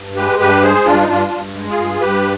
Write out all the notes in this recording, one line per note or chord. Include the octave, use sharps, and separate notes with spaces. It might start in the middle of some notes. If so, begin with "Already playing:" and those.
Already playing: G2
G#3 G4 B4
G2 G4 B4
G#3 G#4 C5
G2 D4 F4
D#4
G2 D4 F4
G2
G#3
F4 G#4
G2
G2 G4 B4